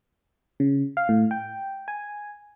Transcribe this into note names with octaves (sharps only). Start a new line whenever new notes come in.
C#3
F5
A2
G5
G#5